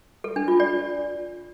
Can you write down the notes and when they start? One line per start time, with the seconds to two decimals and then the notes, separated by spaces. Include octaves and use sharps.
0.24 A4
0.36 D4
0.48 F4
0.60 D5